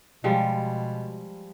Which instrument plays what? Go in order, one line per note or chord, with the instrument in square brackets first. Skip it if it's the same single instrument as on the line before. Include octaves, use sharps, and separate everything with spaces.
[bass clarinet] B2 [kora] F3 G3 G#3